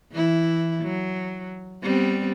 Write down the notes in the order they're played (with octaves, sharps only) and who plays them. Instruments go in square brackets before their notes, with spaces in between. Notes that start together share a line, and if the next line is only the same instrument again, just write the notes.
[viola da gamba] E3 E4
F#3
G3 B3 C4